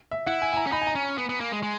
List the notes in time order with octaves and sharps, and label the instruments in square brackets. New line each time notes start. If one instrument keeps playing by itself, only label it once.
[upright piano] E5
[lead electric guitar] E4 [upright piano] F#5
[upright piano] G#5
G#5
A#5
[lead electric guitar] C#4
[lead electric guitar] D#4 [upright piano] B5
[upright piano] G#5
A#5
[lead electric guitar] C#4
B3
B3
A#3
G#3
G#3